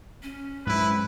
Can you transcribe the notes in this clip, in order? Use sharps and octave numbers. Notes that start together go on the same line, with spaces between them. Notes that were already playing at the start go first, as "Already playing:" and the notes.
C#4
G#2 F#3 E4 B4